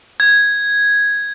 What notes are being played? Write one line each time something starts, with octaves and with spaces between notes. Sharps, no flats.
G#6